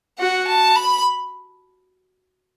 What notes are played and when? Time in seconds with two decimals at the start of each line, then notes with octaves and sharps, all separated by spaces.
0.19 F#4 F#5
0.48 A5
0.76 B5